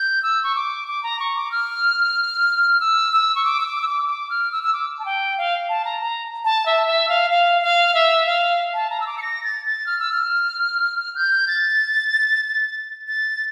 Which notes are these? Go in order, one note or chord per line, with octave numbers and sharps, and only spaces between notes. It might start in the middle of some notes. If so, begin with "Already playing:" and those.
Already playing: G6
E6
C#6
D6
D6
A#5
C#6
D6
F6
E6
E6
C#6
D6
E6
D6
E6
D6
D6
F6
E6
E6
D6
A5
G5
F5
A5
A#5
A#5
A5
E5
E5
F5
F5
F5
E5
F5
A5
A#5
E6
D6
C#7
A#6
A6
A6
F6
E6
F6
G6
A6
A6